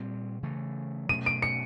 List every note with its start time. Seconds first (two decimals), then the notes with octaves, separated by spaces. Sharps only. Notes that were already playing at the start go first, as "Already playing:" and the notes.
Already playing: A#2 G3 C4
0.43 C#3 E3 A3
1.09 B2 F#3 A3 C#4 D#7
1.26 D7
1.42 C#7